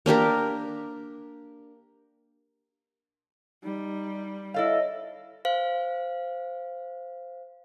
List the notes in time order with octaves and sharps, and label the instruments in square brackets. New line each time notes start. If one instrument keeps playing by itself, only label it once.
[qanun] A#3 D4 G4 A#4
[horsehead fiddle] G3 [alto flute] D#4
[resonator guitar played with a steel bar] E4 A4 F5 [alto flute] C#5 [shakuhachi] D#5
[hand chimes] C5 F5